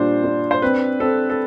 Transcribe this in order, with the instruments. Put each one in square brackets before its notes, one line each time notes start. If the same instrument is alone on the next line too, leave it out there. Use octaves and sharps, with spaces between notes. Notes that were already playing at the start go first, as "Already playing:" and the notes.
Already playing: [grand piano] A#2 G3 D4 [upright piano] C5
[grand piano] D4
[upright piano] C5
[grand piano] C4 [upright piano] B4
[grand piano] C4 [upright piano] A4
[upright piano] A4